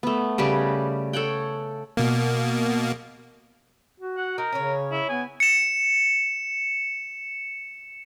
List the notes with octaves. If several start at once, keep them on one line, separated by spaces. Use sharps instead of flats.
A3 B3
C#3 G3 G4 B4
A4 C#5 F#5 G5
B2 A#3
F#4
F#5
D#4 A#4
C#3 C#4 C#5
E4
B3 G#5
C#7 E7